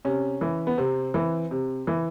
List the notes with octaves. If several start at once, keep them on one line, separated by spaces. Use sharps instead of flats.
C3 C#4
E3
B3
C3 C4
E3
C3
E3